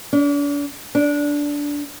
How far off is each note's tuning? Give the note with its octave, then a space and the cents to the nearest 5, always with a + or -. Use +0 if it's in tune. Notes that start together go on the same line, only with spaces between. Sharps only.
D4 -40
D4 -15